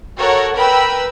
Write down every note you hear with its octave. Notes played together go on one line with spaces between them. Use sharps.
F#4 A4 A#4 C#5 F#5
A#4 B4 G5 B5 E6